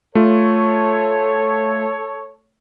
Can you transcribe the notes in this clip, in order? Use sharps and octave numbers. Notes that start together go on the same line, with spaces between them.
A3 F4 A4 C#5